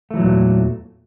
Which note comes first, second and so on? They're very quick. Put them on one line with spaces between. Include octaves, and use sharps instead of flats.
A3 E3 F#3 A#2 E2